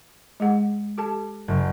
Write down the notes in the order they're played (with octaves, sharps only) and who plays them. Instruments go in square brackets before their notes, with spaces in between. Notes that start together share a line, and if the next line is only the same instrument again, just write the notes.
[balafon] G#3 G#4 F#5
G4 A4 A5
[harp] F#1